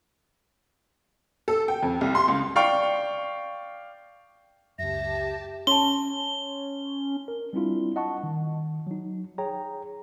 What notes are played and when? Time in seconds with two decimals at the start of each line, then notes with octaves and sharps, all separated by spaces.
1.48 A4
1.68 G5
1.83 F2
2.01 C2
2.15 C6
2.28 C#2
2.56 D5 F5 G5 C#6
4.79 C#2 F#2 G4 E5 A5 A#6
5.67 C#4 A5 C6 G7
7.28 A#4
7.53 G3 C4 D4 E4 F4
7.96 D#5 F#5 A5 C#6
8.23 D#3
8.87 F#3 D#4
9.38 G#4 C#5 G5 A#5